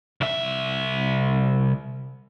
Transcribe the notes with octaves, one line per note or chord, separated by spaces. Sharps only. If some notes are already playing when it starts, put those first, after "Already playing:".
C2 E5